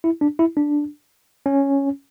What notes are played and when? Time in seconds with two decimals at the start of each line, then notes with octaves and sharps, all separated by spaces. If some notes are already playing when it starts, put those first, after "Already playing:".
0.04 E4
0.21 D4
0.39 E4
0.57 D4
1.46 C#4